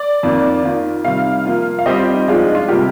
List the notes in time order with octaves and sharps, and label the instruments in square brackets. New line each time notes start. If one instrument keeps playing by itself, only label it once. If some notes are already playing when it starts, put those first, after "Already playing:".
Already playing: [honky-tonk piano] D5
[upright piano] F2 D#3 A#3
D#3 A#3 F4 A#4
[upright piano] C3 D#3 G3 [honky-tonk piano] F5
[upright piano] F3 A#3 F4
[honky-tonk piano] F5
[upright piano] G3 C4 G4 C5 [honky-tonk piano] D#5
[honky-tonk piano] F4
D#4
[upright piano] F3 G#3 D4 F4 [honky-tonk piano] D#4
[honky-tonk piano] D#4
F4
[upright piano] C3 G3 A#3 F4 A#4 [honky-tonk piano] G4